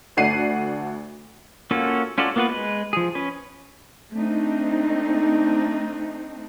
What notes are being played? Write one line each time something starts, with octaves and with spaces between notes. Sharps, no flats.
D2 A3 D5 F#5 C7 D#7
A#3 C#4 F4 F#4 A4
C#4 F4 F#4 A4 D5
A#3 B3 F4 F#4 B4
G#3 B4
F3 G#4
C#4 B4
A3 C4 D4 D#4